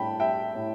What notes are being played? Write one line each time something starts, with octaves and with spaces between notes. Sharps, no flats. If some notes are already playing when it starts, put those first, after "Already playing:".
Already playing: A2 G3 G5 A5 B5
G3 E5 G5
A2